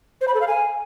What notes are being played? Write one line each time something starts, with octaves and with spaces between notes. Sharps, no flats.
C5
B5
A4
F5
G#5